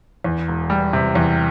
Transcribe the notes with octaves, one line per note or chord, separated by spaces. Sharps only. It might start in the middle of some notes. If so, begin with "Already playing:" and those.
E2
E1
G3
C3
E2